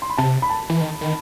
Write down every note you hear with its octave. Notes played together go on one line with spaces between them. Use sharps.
C6
B5
C3 A5
B5
A5
E3
D#3
D#3